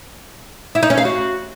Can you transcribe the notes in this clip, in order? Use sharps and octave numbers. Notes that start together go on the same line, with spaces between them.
E4
D#4
C#4
F5
F#4